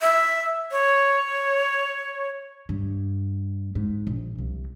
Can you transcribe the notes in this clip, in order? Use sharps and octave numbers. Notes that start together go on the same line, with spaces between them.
E5
C#5
G2
G#2
A#1
C2